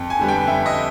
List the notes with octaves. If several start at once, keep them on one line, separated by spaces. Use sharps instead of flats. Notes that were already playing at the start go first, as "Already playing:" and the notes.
Already playing: F2
G#5
D3 G3 B3
G5
F2 E5
D#5